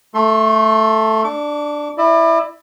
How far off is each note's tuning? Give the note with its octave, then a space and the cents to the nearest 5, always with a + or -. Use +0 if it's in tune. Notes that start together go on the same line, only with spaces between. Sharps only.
A3 +0 A4 +0 C6 +35
D4 +5 D6 -35
E4 +0 D5 +35